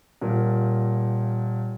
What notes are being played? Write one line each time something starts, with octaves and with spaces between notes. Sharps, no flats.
D#1 A#2 A#4